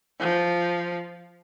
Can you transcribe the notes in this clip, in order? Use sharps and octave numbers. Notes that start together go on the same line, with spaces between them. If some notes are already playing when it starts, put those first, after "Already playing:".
F3